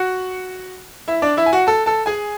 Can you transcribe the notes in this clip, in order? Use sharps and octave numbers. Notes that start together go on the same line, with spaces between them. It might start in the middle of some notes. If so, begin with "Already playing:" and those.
Already playing: F#4 F#5
E4 E5
D4 D5
E4 E5
G#5
F#4 F#5
A4 A5
A4 A5
G#4 G#5